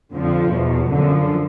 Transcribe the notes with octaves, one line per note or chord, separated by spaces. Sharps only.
F2 D3 F3
E2 B2
F#2 D3 F3